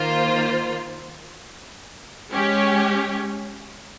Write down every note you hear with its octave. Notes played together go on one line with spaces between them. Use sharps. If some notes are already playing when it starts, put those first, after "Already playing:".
Already playing: D#3 A#3 F4 C5
G#3 C#4 G4 C#5